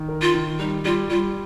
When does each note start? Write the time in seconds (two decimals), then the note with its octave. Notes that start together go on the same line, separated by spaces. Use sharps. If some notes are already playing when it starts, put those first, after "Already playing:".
Already playing: D#3
0.09 A#4
0.22 F4
0.34 D#3
0.59 G3 D#4
0.85 G3 F4
1.10 G3 F4